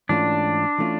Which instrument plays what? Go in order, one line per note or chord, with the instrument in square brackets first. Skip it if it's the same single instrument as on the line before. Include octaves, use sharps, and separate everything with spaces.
[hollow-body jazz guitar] G#2 E3 A3 C#4 F4 [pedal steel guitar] D4
[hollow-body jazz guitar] E3 A3 C#4 F4